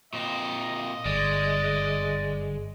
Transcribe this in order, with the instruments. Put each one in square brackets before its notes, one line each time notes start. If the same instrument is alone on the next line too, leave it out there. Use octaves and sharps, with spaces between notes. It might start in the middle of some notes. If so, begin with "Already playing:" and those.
[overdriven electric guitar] A#2 C4 [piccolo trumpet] D#5
[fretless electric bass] G1 [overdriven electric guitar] G#3 [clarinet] D5